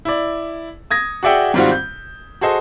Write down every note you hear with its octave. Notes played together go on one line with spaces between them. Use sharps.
E4 D5
D#6 G#6 A#6
F#4 G#4 D5 E5 F#5 G5
G#2 D#3 G3 C4 F4 F#4
G6
F#4 G#4 A4 C5 D#5